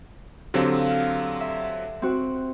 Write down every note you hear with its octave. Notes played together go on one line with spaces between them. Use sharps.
D3 F#3 C4 G4 A4 F5
F6
E5
C4 F#4 F#6